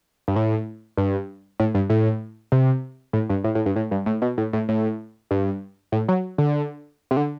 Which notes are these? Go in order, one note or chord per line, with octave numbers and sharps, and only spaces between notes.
G2
A2
G2
A2
G2
A2
C3
A2
G2
A2
A2
G2
A2
G2
A2
B2
A2
A2
A2
G2
A2
F#3
D3
C3
D3